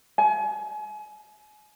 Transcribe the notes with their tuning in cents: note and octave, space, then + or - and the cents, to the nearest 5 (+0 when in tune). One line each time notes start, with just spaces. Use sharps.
G#5 +35